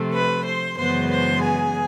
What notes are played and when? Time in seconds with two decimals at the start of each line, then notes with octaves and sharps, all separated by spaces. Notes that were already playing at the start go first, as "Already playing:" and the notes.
Already playing: C3 F3 A3
0.13 B4 B5
0.45 C5 C6
0.77 F#2 C#3 E3 G#3 B3 C5 C6
1.10 C5 C6
1.41 G#4 G#5